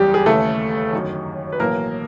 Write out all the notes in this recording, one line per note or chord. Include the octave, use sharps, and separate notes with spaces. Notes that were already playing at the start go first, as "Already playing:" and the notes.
Already playing: F#1 E2 C#3 G3 G4
G#4
D#2 C#3 E3 A3 A4
G1 F#2 D#3
B4
B1 A2 E3 A#3 A#4